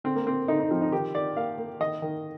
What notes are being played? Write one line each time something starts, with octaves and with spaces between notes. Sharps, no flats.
D3 C4
A#3
A#3 C4
D3 D#4
D#4
F3 C4
D#4
D#3 G4
D#3 D5
A#3 F5
A#3
D#3 D#5
D#3